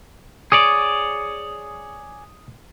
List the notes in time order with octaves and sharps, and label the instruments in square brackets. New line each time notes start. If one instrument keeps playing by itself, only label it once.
[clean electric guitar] G#4 C#5 D5 [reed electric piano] D#6